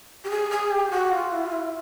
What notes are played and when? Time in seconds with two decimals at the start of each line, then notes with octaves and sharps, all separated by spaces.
0.24 G4
0.30 G#4
0.50 G#4
0.70 G4
0.91 F#4
1.11 F4
1.32 E4
1.46 F4
1.52 E4